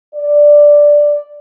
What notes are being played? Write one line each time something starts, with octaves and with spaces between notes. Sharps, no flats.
D5